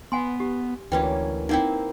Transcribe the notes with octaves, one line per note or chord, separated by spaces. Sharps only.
B3 F#5 G#5 C6
G4
D2 E3 A#3 C#4 F#4 B4 G5
A#3 C4 D#4 E4 F#5 G5